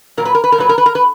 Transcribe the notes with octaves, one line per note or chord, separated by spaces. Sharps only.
A#2 F#3 A#4
B4
A#4
B4
A#4
A#2 F#3 B4
A#4
B4
A#4
B4